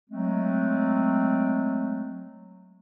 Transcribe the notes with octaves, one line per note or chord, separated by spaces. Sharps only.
F#3 G#3 A3 C4